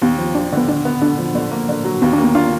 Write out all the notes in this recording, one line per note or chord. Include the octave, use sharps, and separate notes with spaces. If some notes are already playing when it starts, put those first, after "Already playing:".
D#2 B3
F3
D#2 D4
D3 B3
D3 D4
B3
D3 D4
F3
D3 B3
A#3
D3
F#3
D#2 B3
D4
A#3
B3
D4 F4